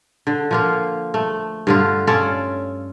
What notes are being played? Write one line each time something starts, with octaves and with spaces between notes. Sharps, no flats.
D3
F3 A#3 F4
A3
G2 D3 F4
C#4 F4 A4 D5